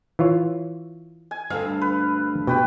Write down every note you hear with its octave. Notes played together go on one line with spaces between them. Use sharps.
E3 F4 C#5
G#5
D2 G2 C4 A4 F5
B4
B2 G4 B4 G5